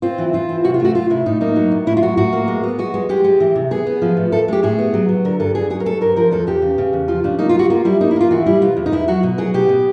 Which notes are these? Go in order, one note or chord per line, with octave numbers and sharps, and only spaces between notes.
C4 F4
E3
E3 F4
C4
C3 F#4
F4
A3 F#4
A3 F4
C3 E4
A2 D#4
A#3 D#4
F#3
A2
A2 E4
F4
F#3 F#4
A2 F#4
A#3
G#3
B3
G#3 F#4
G#3
G#3 G4
G#3
E3
C3
B3 G#4
B3
F3
A2
A2 A4
G#3 G4
A2 G#4
B3
F#3
F#3
D3 A#4
G2 A4
G2 G#4
F#3 G#4
A#4
F#3 A4
G2 A#4
F3 A#4
E2 A4
E2 G4
C#3
C#3
E2
F3 F4
C#3 D4
A#3 D#4
F4
G3 F#4
A#3 F4
G3 E4
A#3 D#4
E4
A#3 F4
E3 F#4
G3 E4
B2 F4
E2
D#4
E2 E4
F#3 F#4
B2
F#3 G#4
B2 G4
B2